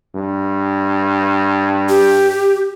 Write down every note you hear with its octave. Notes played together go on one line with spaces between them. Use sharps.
G2
G4